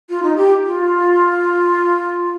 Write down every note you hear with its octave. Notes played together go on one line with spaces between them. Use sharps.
F4
D#4
G4
F4